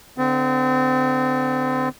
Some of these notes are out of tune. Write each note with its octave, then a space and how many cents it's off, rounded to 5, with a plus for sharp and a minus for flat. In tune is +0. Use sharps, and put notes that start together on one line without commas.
D3 +0 C4 -30